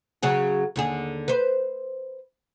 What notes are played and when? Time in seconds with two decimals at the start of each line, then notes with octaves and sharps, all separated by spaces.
0.23 C#3 F#3 G#4
0.76 D#2 D3 G#4
1.28 B4 C5